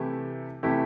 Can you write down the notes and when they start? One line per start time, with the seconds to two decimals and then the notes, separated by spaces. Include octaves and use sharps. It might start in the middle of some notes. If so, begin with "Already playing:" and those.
Already playing: C3 E3 A3 E4 G4
0.63 C3 E3 A3 E4 G4